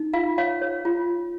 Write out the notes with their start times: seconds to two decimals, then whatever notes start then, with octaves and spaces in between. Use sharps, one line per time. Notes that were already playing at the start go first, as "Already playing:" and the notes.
Already playing: D#4
0.14 F4 F5
0.38 C#5 F5
0.61 C#5
0.85 F4